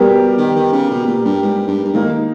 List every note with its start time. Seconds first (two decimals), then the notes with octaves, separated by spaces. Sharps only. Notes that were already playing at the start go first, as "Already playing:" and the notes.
Already playing: B2 G3 B3 G4 A#4
0.38 D#3
0.56 D#3
0.73 C#3
0.90 B2
1.07 A#2
1.25 G2
1.42 G#2
1.68 G2
1.85 G2
1.93 G#2 D#3 A#3 D#4